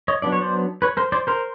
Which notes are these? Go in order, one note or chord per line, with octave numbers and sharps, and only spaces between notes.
C#5 D#5
F#3 B3 D4 D5
C#5
C5 D5
B4 C#5
A#4 C5
C5 D5
A#4 C5